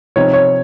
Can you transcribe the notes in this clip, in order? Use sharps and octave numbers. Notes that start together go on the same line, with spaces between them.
C3 F3 C4 D#4 C#5
C#5